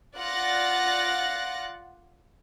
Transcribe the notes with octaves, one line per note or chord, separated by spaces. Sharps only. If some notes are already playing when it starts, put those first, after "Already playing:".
F4 D5 F#5 F#6 A6 A#6